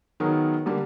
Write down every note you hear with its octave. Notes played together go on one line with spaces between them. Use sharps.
D#3 F#3 B3 D#4 G#4 A#4
D3 G3 A#3